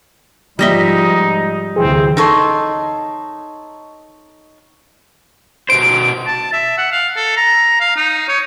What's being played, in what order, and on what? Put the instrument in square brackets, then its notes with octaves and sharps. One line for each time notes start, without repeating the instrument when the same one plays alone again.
[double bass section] G#2 F3 G#3 [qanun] G3 D#5 E5 [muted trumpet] D#4
[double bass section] D2 C3 E3 [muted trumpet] C4 [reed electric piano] G#4
[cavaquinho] D#4 A4 C#5 C6
[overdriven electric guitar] B2 C5 [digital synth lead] D7
[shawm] A5
E5
F#5
F5
A4
A#5
F5
D#4
C#5